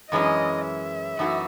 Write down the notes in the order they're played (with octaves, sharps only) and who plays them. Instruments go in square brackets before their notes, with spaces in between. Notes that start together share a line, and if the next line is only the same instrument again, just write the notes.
[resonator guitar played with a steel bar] F#2 E3 G#3 C#4 [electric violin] D#5
[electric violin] E5
[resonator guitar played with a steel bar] F#2 E3 A3 D#4 F#4